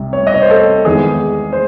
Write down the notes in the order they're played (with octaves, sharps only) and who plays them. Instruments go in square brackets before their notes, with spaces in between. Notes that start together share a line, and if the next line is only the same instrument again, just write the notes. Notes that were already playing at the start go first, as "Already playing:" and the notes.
Already playing: [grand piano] C2 C3
C#5
D#5
C#5
C5
A4
E2 D#3 G#3 G#4
C5